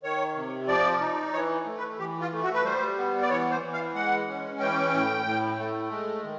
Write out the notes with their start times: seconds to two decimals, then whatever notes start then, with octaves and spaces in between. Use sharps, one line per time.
0.03 D#3 C#5
0.36 C3
0.68 F3 D5
1.01 D#4
1.33 E3 C#5
1.66 A3
1.77 B4
1.99 E3 G4
2.21 F4
2.32 A3
2.43 F#4
2.54 B4
2.65 G3 C5
2.98 B3
3.22 D5
3.30 E3 C#5
3.51 C5
3.63 E3
3.73 F5
3.95 G#3 F#5
4.28 C#4
4.60 E3 G5
4.93 A2
5.26 A2
5.59 A3
5.91 G#3
6.24 D#3